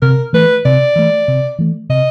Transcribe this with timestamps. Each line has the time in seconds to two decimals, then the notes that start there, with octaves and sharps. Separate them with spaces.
0.02 C3 A#4
0.33 E3 A3 B4
0.65 C3 D5
0.96 E3 A3
1.28 C3
1.59 E3 A3
1.89 C3 D#5